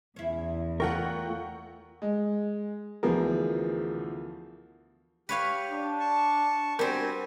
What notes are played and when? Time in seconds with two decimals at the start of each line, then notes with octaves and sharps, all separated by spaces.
0.16 E2 C#4 E4
0.80 A3 F4 A#4 F#5 G5 C#6
2.02 G#3
3.03 D2 E3 F3 B3 G#4 A#4
5.29 G4 B4 C#5 F5
5.70 D4
6.00 A5 C#6
6.79 G3 B3 C4 D4 F#4 A#4 C5 G#5